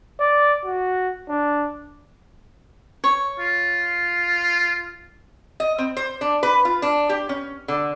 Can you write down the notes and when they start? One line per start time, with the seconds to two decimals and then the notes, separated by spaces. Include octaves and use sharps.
0.20 D5
0.65 F#4
1.29 D4
3.04 C#5
3.40 F4
5.60 D#5
5.78 C4
5.97 C5
6.21 D4
6.43 B4
6.65 F4
6.82 D4
7.09 G4
7.29 C#4
7.68 D3